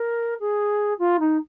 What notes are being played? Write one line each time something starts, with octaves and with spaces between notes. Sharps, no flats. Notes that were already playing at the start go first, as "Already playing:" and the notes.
Already playing: A#4
G#4
F4
D#4